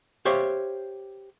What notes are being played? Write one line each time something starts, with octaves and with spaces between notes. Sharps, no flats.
G4 C5 C#5 E5 F5